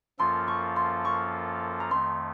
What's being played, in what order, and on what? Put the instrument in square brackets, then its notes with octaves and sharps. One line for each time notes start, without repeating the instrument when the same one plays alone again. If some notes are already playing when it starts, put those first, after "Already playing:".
[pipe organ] F#2 F3 A#3 F4 A4 [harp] C6
[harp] C#6
C6
C#6
A#5
[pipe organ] F2 D#3 A3 [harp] C6